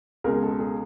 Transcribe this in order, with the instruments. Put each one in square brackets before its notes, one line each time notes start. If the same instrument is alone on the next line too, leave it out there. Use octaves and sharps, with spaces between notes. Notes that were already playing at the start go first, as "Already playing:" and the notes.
[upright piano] C#2 B2 G#3 G#4 A#4
A4
G#4